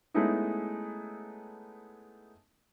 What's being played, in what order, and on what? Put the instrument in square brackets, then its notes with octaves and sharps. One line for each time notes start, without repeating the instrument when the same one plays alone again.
[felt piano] G#3 A3 B3 C#4 D#4 E4